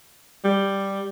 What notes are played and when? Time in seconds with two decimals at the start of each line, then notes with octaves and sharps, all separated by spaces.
0.44 G3